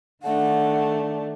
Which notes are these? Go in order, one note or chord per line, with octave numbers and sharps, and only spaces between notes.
D#3 A3 D4 F#5